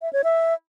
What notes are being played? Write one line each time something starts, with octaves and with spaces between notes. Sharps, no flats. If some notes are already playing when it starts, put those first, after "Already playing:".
E5
C#5
E5